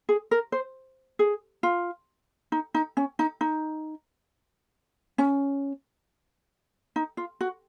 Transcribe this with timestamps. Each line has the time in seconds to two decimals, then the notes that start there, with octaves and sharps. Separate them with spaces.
0.09 G#4
0.31 A#4
0.52 C5
1.19 G#4
1.63 F4
2.52 D#4
2.74 D#4
2.97 C#4
3.19 D#4
3.41 D#4
5.18 C#4
6.96 D#4
7.17 F4
7.41 F#4